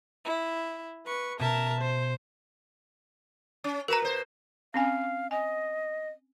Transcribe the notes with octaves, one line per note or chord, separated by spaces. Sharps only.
E4
B4 C#6
B2 A#4 E5 A5
C5
C#4
F#4 A#4 B4 A#5
B2 C5
C4 C#4 F5 G#5
D#5 G#5